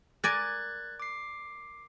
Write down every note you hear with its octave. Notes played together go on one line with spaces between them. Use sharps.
A#4 D5 G#5 F#6 G#6 A6
D6 C7